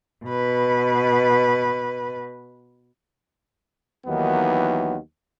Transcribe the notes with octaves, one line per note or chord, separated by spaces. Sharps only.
B2 B4
D#2 D#3 E3 F#3 B3